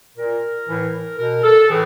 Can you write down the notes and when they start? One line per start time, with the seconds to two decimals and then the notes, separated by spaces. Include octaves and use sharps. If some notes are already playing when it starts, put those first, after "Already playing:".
0.17 A#2 A#4
0.69 A2 E3
1.19 B2 A#4
1.43 A4
1.69 A2 E3 G#4